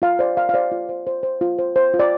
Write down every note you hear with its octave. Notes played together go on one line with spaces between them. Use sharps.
F4 F5
C5 D5
F4 F5
F5
C5 D5
F4
C5
C5
C5
F4
C5
C5
F4
D5